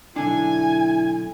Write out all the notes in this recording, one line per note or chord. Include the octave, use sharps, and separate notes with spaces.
B1 D3 D4 E4 G#5